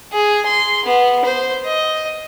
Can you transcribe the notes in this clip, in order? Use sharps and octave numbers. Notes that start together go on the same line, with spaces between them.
G#4
C6
B3
C5
D#5